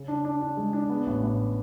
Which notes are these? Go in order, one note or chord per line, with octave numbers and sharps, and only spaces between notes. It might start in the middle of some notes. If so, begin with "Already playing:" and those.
Already playing: C#3
D4
D4
D4
G#3
D4
B3
A1
A1